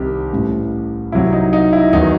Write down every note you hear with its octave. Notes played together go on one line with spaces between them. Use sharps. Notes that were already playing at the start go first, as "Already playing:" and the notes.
Already playing: C2 C3 D#3 G3 G4
A1 A2 G3
C2 C3 F#3 E4
D#4
D#4
E4
E2 D#3 F#3 D#4